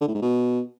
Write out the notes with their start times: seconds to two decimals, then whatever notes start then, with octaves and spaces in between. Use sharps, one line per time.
0.01 D3
0.08 A2
0.15 G#2
0.22 B2